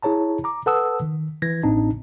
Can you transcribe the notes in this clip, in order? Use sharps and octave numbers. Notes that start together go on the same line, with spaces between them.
E4 G#4 C#5 A5 A#5
A#5 D6
A4 B4 F#5 A5 D#6 E6
D#3
E3 G#6 A#6
A1 A2 C4 D4 D#4 A5